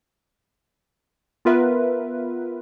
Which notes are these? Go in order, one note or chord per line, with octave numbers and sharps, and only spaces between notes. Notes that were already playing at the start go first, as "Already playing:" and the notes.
B3 F4 A#4 B4 E5